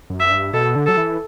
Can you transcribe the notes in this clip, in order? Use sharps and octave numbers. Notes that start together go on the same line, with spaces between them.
F#2
E5
G2
B2 A4
D3
F#3 A4
E3